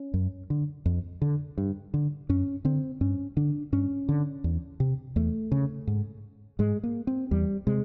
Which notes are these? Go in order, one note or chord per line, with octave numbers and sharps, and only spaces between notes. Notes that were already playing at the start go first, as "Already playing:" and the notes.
Already playing: C#4
F#2
D3
F2
D3
G2
D3
F#2 C#4
D3 C4
G2 C#4
D3 D4
G2 C#4
D3
E2
C3
E2 A3
C#3
G#2
G#2 G#3
A#3
C4
E2 G3
C3 G#3